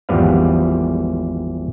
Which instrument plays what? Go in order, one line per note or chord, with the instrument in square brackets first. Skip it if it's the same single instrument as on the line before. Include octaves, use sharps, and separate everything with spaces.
[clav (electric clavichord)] G#1 E2 F3 G3 B4 F5